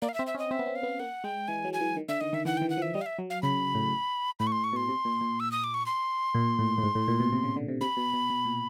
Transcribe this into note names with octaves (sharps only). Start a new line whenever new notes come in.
A#3 D5
F5
E5
C4
E5
C#4
D#5
C4 E5
B3
C4
F5
B3
A#3 F#5
G#3 G5
E3 G#5
F#3
G#5
E3
D#3
D3 E5
D#3 D#5
D#3 E5
E3 F#5
E3 G5
F#5
F3
E5
G3 D#5
F5
E5
F#3
F5
C#3 B5
A2
A2 B5
C#6
C6
C#6
B2
C6
C3
A#2
A#2
E6
D#6
D6
C#6
C6
A#2
A2
A2
G#2
A2
A#2
B2
C3
C#3
D3
C3
C3 B5
B2
B2
B2
A#2